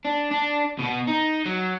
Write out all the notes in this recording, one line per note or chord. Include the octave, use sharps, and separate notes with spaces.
D4
D4
B2 B3
D#4
F#3